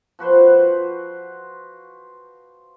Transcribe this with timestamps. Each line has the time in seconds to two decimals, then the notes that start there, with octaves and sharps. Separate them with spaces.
0.19 F3 F#4 B4 C5